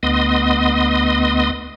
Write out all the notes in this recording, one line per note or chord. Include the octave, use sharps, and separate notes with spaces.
D2 B3 D#5 C6 D#6